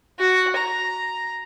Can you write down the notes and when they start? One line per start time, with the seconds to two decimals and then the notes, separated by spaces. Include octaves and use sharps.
0.20 F#4
0.57 A#5